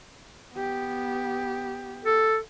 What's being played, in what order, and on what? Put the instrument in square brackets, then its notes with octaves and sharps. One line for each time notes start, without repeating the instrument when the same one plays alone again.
[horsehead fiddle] B3 G4
[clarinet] A4